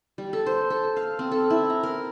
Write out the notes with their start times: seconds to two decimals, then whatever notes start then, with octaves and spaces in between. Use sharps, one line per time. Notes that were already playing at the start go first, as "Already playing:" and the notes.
0.18 G3
0.33 A4
0.46 C5
0.70 A4
0.96 F5
1.19 C4
1.31 A4
1.50 E4
1.70 A#5
1.83 A#4